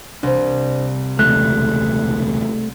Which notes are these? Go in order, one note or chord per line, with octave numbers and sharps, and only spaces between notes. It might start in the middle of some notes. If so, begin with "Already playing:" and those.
C2 D4 C5
E1 C#2 A3 F#6